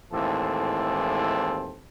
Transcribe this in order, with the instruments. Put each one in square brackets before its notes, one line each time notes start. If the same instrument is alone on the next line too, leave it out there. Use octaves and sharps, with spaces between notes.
[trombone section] D#2 A2 E3 G#3 C4 A4